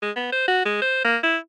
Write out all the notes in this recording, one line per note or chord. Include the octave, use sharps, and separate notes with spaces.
G#3
B3
C5
F#4
G#3
C5
A#3
E4